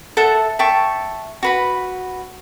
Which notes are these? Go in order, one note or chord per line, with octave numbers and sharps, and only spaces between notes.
A4 E5 F#5 A5
E5 G5 A5 C#6
F#4 B4 B5